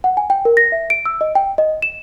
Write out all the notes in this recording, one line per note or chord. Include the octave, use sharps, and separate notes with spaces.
F#5
G#5
G5
A#4
A#6
E5
D7
E6
D#5
G5
D#5
E7